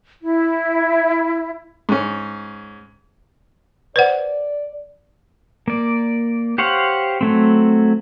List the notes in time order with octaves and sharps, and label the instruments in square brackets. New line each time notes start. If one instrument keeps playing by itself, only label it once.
[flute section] E4
[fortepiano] G#2 C#4
[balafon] B4 C5 F#5 [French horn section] D5
[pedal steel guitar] A#3 D5
G4 C5 C#5 F5 F#5
F#3 A3 C4